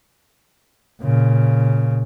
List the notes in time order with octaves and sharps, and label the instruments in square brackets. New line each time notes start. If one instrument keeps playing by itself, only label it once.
[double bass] A#2 C#3